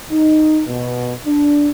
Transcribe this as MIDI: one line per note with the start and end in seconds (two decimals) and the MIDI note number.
0.11 0.62 63
0.68 1.13 47
1.26 1.70 62